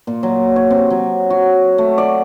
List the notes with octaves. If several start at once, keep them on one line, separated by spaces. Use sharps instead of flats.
A#2
F#3
C#5
C3
F#3
F#4
A3
D5